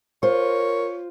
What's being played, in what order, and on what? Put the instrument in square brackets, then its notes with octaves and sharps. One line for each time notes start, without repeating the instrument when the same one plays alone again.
[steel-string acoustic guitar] F4 C5 [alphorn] A#4 [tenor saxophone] C#5